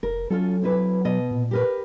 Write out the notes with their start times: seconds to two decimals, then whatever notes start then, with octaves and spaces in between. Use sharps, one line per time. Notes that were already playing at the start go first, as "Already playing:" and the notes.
0.03 F1 A#4
0.30 F#3 C#4 F4 A4
0.62 C4 E4 B4
1.05 B2 D#5
1.31 A#2
1.51 G4 A#4 B4